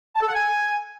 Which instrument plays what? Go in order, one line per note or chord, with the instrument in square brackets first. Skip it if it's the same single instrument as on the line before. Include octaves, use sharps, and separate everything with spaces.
[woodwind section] A5
A4
F#5
G#5